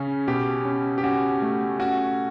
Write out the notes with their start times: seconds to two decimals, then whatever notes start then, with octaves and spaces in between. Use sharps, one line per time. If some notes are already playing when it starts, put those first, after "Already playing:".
Already playing: C#3 C#4
0.28 B2 G4
0.65 C#4
0.98 G4
1.03 C#4 F#4
1.42 A3
1.79 C#4 F#4